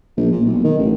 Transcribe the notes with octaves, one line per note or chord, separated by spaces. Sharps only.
A#1
A#2
B1
D#3
A1